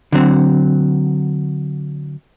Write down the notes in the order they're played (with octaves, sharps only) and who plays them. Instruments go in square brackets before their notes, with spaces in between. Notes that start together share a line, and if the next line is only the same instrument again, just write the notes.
[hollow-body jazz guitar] D3 F#3 C4